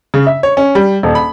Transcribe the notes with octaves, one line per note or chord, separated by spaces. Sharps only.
C#3
E5
C#5
C#4
G3
D#1
B5